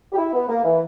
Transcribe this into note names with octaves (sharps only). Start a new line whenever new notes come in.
G4
E4
B3
A#3
E3